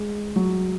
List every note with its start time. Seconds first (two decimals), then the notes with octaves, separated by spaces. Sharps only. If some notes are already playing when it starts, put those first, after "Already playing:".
Already playing: G#3
0.36 F#3